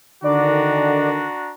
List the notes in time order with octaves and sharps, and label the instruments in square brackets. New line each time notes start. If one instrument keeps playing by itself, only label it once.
[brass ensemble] D3 D#3 [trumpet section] D4 F#4 A#5 [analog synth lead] D5